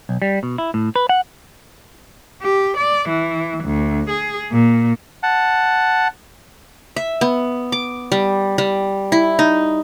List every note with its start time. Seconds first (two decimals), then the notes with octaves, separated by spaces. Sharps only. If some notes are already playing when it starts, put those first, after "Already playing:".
0.09 B1
0.22 G3
0.43 B2
0.58 E4
0.74 A2
0.96 B4
1.09 F#5
2.42 G4
2.77 D5
3.09 E3
3.64 D2
4.10 G#4
4.52 A#2
5.23 F#5 A5
6.96 E5
7.21 B3
7.72 D6
8.12 G3
8.58 G3
9.12 E4
9.39 D#4